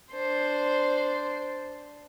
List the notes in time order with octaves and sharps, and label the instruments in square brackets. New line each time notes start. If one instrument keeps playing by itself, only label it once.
[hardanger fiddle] D4 C5